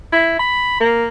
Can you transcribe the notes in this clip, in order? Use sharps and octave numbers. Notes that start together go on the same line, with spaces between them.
E4
B5
A#3